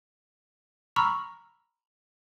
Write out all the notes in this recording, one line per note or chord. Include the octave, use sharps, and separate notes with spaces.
A#5 B5 C#6 E6 F6